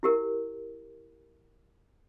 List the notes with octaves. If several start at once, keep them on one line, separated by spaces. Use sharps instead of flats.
E4 G4 A#4